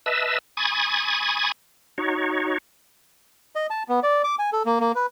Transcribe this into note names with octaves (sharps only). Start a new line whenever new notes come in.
B4 D#5 E5 A5 E6
G#5 B5 C#6 D#6 G#6 A6
D#4 F#4 C#5
D#5
A5
B3
D5
D6
G#5
A4
A#3
A#3
B4